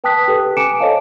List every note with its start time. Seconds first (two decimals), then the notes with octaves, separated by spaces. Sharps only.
0.04 B4 G5 A5 D#6 F#6 B6
0.28 G4 A4 B4
0.57 G#5 A#5 D6 C#7 D7 E7
0.79 A4 C5 C#5 D#5 F5 A5